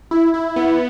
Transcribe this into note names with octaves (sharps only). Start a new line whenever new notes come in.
E4
E4
B3